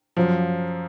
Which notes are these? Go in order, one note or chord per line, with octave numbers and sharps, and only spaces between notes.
F#2 F3